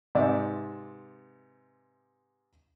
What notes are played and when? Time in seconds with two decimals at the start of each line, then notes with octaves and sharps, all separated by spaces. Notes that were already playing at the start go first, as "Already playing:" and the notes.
0.15 G#2 C3 B4 D5 E5